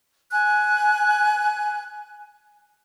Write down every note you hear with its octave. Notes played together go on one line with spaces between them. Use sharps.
G#5 F#6